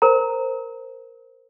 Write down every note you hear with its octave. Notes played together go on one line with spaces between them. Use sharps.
A#4 C5 A#5